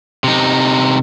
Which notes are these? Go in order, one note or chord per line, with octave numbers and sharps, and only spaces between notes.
C3 D#4